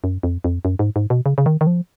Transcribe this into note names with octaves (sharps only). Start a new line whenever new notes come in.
F#2
F2
F2
F#2
G#2
G#2
B2
C#3
C#3
D#3
D#3
F3